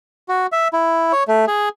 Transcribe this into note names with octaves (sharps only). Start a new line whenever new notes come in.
F#4
E5
E4
C#5
A3
G#4